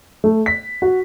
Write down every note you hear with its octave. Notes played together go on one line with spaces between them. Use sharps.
A3
B6
F#4